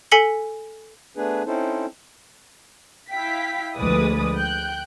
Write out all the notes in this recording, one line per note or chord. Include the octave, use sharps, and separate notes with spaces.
A4 G#5 B6 C#7 F#7 G7
A3 B3 D4 G#4 B4
C4 C#4 D#4 E4 A4 C5
E4 F5 G5 B6
D2 F3 G#3 B4 D5 D#6
G5 F#6 G6